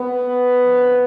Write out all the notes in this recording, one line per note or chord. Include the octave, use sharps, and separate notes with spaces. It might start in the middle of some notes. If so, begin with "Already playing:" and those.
Already playing: B3
F2 D3 F3